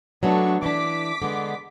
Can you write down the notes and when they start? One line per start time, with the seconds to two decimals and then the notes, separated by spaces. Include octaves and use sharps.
0.23 F#3 A3 B3 D4 A4 C#6
0.63 E3 D4 D6 B6
1.22 D3 G#3 B3